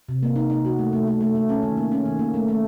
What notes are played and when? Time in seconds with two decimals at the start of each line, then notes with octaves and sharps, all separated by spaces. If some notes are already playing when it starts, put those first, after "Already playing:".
0.09 C3
0.23 A#3
0.36 D#4
0.50 D#4
0.65 F#4
0.79 A3
0.93 A3
1.07 A3
1.21 A3
1.35 A3
1.49 C#4
1.63 D#3
1.77 A#3
1.92 C#4
2.06 D#3
2.19 A#3
2.34 A3
2.48 A3